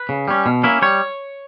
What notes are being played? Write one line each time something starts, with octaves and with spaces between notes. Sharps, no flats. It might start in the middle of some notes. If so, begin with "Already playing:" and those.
Already playing: B4
C#3
G3 C#4
B2
A#3 C#4 E4
G3 C#5